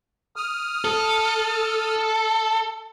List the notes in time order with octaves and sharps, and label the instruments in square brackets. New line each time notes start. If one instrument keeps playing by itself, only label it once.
[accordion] D#6 F6
[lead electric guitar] A4